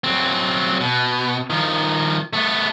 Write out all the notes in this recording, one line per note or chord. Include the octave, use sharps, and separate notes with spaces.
F#3 C4
B2
D#3 F3
A3 B3